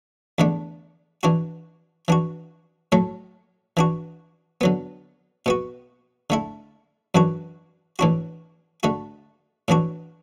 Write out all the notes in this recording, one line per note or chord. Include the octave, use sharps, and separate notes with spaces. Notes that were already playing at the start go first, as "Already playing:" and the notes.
E2 D3 A3 D4
E3 D4 F#4
E3 D4 F#4
A2 F#3 A3
E3 D4 F#4
D3 F#3 B3
B2 B3 F#4
D3 A3 E4
F#2 E3 D4 F#4
A2 E3 D4 F#4
D3 A3 F#4
A2 E3 D4 F#4